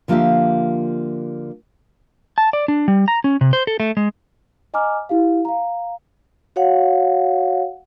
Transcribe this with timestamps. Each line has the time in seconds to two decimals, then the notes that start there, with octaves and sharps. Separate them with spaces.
0.08 D3 F3 A#3 F4 G4 E5
2.38 A5
2.53 D5
2.68 D4
2.88 G3
3.08 A#5
3.24 C#4
3.41 C3
3.53 C5
3.67 A4
3.80 A3
3.97 G#3
4.74 D#5 G#5 A#5 D6 F6
5.09 E4 G4 F5
5.45 F5 A#5
6.56 F#4 C#5 F5 F#5